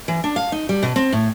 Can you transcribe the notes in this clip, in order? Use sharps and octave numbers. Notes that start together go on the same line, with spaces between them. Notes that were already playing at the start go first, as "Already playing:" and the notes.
E3
D4
F5
D#4
G3
B2
C4
A2